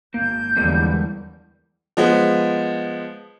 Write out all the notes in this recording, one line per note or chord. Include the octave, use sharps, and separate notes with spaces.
G#1 A#3 G6
E2 D3 F3 G3 G#3 A#3
F3 G#3 B3